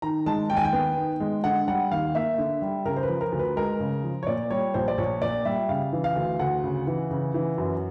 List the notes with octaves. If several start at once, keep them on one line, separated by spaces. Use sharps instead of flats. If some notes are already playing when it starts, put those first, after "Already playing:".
D#3 A#5
G#3 A5
D#2 G5
G#5
G5
B3
D#3
G#3
D3 F#5
G3 F#5
D#2 F5
A#3 E5
D3
G3
C#3 A#4
C5
B4
F3
A#4
D2
B4
G#3 A#4
C#3
F3
C#5
A#2 D5
G3 C#5
A#1 C5
D5
A#1 C#5
A#2 D5
G3 E5
C#3 F5
E3
F5
D2
D2 F#5
C#3
E3
C#3
E3
F#2